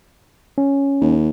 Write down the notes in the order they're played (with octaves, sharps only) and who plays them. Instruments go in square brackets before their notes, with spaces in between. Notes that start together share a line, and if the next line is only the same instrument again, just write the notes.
[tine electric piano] C#4
[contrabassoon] D#2